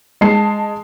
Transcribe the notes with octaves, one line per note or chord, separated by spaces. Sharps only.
G#3 A5 C7